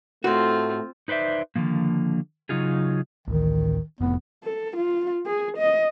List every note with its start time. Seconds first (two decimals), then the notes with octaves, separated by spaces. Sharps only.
0.24 A2 A3 C4 F4 F#4
1.08 D#4 B4 C5 D5 E5
1.56 D3 D#3 F3 A#3
2.49 C#3 F#3 D#4 F4 G#4
3.28 D1 A1 D#3
4.01 F1 F2 A2 B3
4.44 A4
4.76 F4
5.26 G#4
5.57 D#5